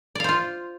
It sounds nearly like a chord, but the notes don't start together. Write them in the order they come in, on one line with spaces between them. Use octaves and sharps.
D5 F5 C5 F4